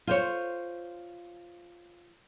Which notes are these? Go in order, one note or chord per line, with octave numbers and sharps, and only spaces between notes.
F4 C5 C#5